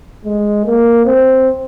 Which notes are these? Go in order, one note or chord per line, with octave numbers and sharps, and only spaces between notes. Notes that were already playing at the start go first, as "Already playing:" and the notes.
G#3
A#3
C4